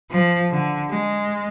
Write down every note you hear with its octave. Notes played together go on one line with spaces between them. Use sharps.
F3
D3
G#3